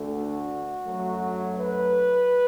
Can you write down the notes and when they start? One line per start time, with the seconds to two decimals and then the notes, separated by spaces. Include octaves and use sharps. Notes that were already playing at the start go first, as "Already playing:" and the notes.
Already playing: D2 D3 A3
0.12 F#4
0.86 F#2 F#3 A3
1.60 B4